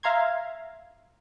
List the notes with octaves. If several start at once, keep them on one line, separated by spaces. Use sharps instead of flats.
E5 F5 A#5 C6 G#6